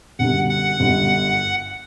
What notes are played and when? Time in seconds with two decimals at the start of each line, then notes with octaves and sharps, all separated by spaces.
0.19 G1 F#2 D3 G3 F#5
0.49 F#5
0.79 G1 F#2 D3 G3